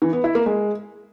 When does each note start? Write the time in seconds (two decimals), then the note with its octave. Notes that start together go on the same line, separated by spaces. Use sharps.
0.02 E3
0.13 B3
0.24 E4
0.35 A#3
0.46 G#3